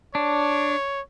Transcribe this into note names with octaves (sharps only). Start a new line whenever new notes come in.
D4 C#5